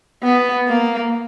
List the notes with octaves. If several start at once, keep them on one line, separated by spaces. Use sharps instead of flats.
B3
A#3